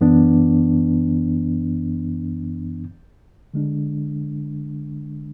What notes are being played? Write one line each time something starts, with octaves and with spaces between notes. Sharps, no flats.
F#2 E3 B3 D4
D3 G#3 D4